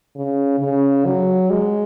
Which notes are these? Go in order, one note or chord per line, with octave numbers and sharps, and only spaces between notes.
C#3
C#3
F#3
G#3